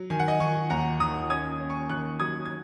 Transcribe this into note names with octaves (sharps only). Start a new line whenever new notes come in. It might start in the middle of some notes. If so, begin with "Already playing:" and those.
Already playing: F#3
D#3 G#5
F#5
D#5 G#5
D#3 G#5 C#6
D#2 F#5 A#5
D#3 A#5 D#6
C#4 D#6 G#6
C#4
G#5 C#6
D#3 C#6 F#6
F#3 D#6 G#6
G#6